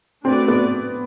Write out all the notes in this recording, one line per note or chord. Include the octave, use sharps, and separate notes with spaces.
A3 C4 D4 F#4 B4 D5
B3